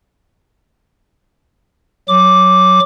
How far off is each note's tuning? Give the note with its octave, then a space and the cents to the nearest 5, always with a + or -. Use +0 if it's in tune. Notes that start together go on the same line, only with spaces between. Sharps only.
F#3 +0 D6 +0